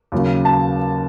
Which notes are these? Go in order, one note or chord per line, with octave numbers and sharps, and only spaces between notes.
D#2 C#3 F#3
A5